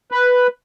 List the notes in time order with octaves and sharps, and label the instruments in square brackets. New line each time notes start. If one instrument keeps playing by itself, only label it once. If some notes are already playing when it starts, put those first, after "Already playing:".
[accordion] B4